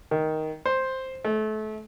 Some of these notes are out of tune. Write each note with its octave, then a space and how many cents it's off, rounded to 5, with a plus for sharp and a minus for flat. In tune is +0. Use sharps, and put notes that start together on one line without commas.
D#3 +10
C5 +5
A3 -30